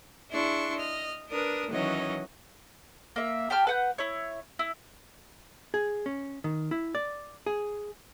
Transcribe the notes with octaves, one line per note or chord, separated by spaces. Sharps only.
D4 E4 G#4 C6 C#6
D#5 F6
D4 A#4 B4 D#6
D#3 E3 F#3 C#4 D#5
A#3 E5
G4 G5 A5 F6
B4 F#5 G6
E4 C#5
E4
G#4
C#4
D#3
E4
D5
G#4